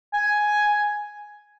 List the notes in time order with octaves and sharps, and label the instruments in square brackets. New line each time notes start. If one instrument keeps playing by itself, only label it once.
[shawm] G#5